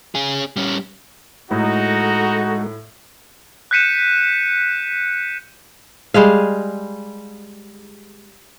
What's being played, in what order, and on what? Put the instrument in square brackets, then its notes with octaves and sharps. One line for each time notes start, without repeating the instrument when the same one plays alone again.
[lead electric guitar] C#4 G#4
G3 C#4
[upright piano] A2 [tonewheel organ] G#3 A4 [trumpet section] D#4 F#4
[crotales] F#6 G6 B6 C#7 D#7 E7
[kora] G3 G#3 G#4 F5